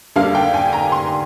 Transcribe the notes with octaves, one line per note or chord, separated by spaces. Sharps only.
D2 D3 G3 A#3 D4 F5
G5
G#5
A#5
C6